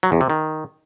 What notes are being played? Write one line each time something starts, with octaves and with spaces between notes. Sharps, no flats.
F#3
E2
C3
D#3